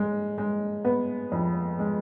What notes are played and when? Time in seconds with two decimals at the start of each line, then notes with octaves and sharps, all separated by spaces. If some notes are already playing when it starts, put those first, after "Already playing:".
Already playing: G#3
0.38 G#3
0.85 B3
1.32 F2
1.79 G#3